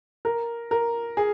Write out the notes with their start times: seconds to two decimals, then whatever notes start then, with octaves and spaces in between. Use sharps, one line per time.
0.25 A#4
0.71 A#4
1.17 G#4